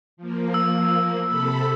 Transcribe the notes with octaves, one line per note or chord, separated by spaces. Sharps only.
F3 A#3
E6
C3 A4 B5